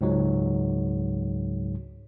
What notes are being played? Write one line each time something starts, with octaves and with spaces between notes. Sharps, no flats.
C#2 G#2 F#3